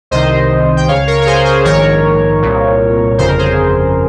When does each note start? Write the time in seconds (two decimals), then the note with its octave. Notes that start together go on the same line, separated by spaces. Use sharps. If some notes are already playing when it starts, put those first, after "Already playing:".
0.11 C2 C3 D#3 C5 D#5
0.77 G5
0.88 C#2 C#3 C#5 F5
1.07 A#4 C#5
1.22 A#4
1.26 G#4 C5
1.45 G#4 C5
1.65 A#1 G#2 D#3 A#4 C#5
2.42 C2 A#2
3.18 G1 F2 C#3 C5
3.28 A#4
3.38 G#4 C5